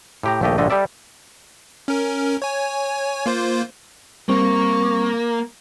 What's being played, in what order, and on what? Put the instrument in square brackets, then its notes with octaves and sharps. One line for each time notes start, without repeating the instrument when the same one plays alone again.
[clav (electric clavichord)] A2 G4 A#5
A#1 D#2 A3 G4 D#5
A#1 G2 D3 A3 D#5
G3 A4 D5 E5
[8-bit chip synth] C#4 A#4
C#5 G#5
A#3 F4 C5
[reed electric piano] G3 C4 [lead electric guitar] A#3 [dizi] C#6